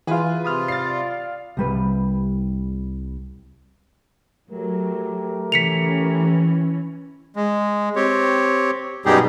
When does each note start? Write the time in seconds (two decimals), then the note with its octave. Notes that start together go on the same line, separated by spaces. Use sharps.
0.07 E3 F4 G#4 B4
0.44 C3 F4 B5 D#6 F6
0.68 D5 F5 A6 C7
1.57 C2 G3 B4
4.51 F#3 A3 G4 A#4
5.52 E3 C#4 B6 C#7 F7
7.36 G#3
7.96 C4 G4 C#5
9.05 F#2 B2 G3 D#4 G4 G#4